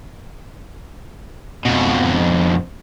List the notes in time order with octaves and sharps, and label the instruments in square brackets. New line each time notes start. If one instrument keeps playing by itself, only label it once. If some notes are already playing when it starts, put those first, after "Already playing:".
[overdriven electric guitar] F2 B2